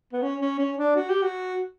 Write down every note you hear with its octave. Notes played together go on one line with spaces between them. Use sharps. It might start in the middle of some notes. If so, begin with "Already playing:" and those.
B3
C#4
C#4
C#4
D4
F#4
G4
F#4